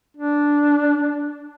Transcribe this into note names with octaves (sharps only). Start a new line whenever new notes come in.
D4